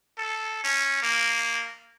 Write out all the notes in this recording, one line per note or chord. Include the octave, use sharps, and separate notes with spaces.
A4
C#4
A#3